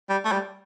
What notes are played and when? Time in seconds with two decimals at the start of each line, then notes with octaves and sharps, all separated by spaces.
0.10 G3
0.25 A3
0.32 G3